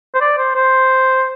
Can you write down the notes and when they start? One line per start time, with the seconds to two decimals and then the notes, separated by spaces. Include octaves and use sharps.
0.14 C5
0.21 D5
0.38 C5
0.56 C5